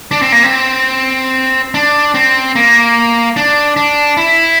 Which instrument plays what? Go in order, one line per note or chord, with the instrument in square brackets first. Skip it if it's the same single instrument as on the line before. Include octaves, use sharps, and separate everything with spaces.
[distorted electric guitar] D4
C4
A#3
C4
D4
C4
A#3
D4
D4
E4